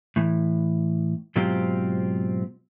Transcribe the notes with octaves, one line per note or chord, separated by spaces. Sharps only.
A2 E3
G#2 B2 F#3 C4 F4 G4